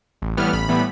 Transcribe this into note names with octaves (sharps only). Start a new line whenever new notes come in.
A1
A2 E3 G3 B3 F6
A1 B5
A2 E3 G3 B3